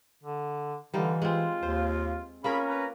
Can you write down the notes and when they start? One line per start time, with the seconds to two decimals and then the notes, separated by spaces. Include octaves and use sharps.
0.24 D3
0.94 D3 E3 G3 D#4 F4
1.22 G#3 C4 F4
1.63 D#2 C5
2.44 A#3 C#4 F4 G#4 A#4 B5
2.67 B4 A#5